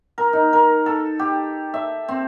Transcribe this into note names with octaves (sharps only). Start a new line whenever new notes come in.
A#4
D#4
A#4
A4
G4
E5
C4